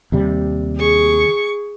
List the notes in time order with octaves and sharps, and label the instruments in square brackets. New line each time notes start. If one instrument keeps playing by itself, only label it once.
[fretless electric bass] D#2 C3 G3
[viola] G#4 C#6